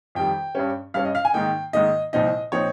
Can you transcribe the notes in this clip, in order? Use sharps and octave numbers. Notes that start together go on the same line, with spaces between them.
F2 D#3 G3 G5
G2 G3 C#4
G2 G3 C#4 F5
D#5
F5
G#5
G#2 D#3 A#3 D#4 G5
G#2 D#3 A#3 D#4 D#5
C2 A#2 F3 C4 D#4 D#5
A#2 F3 C4 D#4 C#5